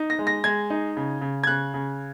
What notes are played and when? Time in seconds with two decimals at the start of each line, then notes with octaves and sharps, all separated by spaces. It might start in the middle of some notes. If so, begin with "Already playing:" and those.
Already playing: D#4
0.10 A#6
0.19 G#3
0.27 A#6
0.44 G#3 G#6
0.70 D#4
0.97 C#3
1.21 C#3
1.44 G#6
1.47 C#3 F#6
1.74 C#3